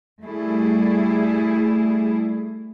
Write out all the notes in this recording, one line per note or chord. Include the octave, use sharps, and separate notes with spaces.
G3 A3 E4 G#4